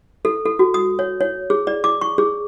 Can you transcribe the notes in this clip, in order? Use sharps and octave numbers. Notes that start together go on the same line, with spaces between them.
A4
A4
F#4
D#6
C#5
C#5
G#4
D5
D6
C#6
G#4